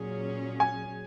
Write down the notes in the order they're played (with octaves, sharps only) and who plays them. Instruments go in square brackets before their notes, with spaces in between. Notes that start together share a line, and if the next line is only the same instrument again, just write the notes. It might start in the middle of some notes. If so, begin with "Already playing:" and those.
Already playing: [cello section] A#2 F#3 C#4 G#4
[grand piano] G#5